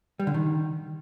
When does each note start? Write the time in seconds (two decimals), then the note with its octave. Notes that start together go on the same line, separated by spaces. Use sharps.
0.19 G3
0.27 D3
0.34 D#3